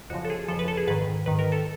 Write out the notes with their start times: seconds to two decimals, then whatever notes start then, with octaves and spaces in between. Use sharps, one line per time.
0.10 F2 C#3 F3 F#4
0.25 A4
0.30 G#4
0.48 F2 C#3 F3 A4
0.59 B4
0.68 A4
0.77 G#4
0.87 G#2 D#3 B4
1.26 G#2 D#3 B4
1.39 A#4
1.52 A4